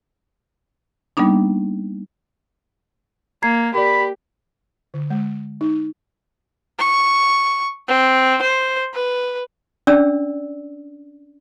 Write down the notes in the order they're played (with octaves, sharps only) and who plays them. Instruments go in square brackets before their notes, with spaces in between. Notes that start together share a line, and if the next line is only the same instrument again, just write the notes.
[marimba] G3 A#3 B3 D4 D#4
[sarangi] A#3 [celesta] A#5 G#6 C7
[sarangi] G4 [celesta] A#4 D5 [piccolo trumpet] B5
[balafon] D3
G#3
D#4
[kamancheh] C#6
C4
C5
B4
[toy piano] C#4 D4 D5 E6